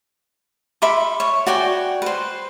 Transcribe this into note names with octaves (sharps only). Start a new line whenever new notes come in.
E5 B5 C6 D6
C#5
F#4 D5 G5 G#5
B4 C5